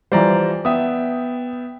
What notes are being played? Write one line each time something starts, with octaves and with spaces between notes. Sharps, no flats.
E3 F3 G3 C5 D5 A#5
B3 E5 G5 D#6